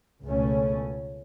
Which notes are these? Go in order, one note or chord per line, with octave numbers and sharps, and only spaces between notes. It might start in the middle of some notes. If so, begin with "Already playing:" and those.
C#2 B2 A3 C#4